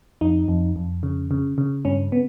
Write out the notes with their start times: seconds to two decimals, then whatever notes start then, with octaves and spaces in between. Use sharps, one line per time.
0.21 F2 D#4
0.48 F2
0.76 F2
1.03 C#3
1.31 C#3
1.58 C#3
1.85 G2 C#4
2.12 B3